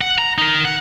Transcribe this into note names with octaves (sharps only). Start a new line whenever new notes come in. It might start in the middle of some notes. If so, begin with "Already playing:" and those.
F#5
A#5
D#4 A#4
F#5